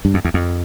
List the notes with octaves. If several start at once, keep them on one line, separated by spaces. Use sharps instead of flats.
G2
F2
E2
F2